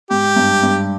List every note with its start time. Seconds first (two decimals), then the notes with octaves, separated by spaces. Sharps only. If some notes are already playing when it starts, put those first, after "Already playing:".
0.10 G#2 G4
0.36 G2
0.63 G2